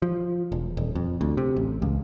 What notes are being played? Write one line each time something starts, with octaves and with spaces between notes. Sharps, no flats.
F3
E1
D#1
F2
D2
C3
A1
C#2